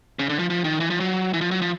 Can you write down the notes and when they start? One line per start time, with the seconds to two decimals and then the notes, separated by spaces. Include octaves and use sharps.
0.19 C#3
0.29 D3
0.39 F3
0.50 F3
0.64 D#3
0.80 E3
0.90 F3
1.00 F#3
1.34 E3
1.41 F3
1.51 F#3
1.62 F3